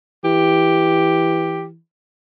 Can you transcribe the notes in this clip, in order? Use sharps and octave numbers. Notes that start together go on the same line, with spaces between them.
E3 G4